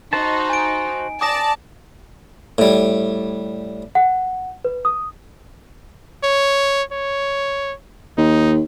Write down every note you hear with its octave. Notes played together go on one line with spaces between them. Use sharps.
D#4 F#4 C5 A5
G#5 D7
D5 A5 D6 D#6 A#6
A2 G3
F#5
B4
D#6
C#5
C#5
D#2 D#4